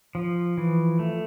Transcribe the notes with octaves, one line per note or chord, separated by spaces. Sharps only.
F3
E3
A3